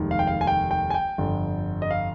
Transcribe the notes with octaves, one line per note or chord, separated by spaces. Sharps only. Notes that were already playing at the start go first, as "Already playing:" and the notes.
Already playing: F1 D#2 D#3 G#3
F5
G5
F5
G#5
G5
G5
G#5
G5
G1 F2 D3
D#5
F5